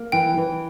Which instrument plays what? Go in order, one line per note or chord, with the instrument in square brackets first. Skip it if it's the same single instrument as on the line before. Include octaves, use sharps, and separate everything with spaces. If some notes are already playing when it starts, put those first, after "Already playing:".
Already playing: [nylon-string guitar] A#3
[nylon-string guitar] E3 [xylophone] G5
[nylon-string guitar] E3